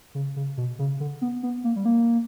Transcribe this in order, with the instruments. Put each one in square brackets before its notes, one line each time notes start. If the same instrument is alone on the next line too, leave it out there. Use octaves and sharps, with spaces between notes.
[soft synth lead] C#3
C#3
B2
C#3
D3
B3
B3
A#3
G3
A#3